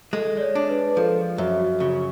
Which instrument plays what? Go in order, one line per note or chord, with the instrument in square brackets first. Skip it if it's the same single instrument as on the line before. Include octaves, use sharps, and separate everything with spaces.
[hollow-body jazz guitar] G#3 [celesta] A4
[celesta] D5
C#5
[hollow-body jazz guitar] D4
[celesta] B4
[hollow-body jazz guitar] F3 [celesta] A4
[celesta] G#4
[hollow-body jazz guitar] F#2 [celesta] F#4
[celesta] F#4
[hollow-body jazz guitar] C#3 [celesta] F#4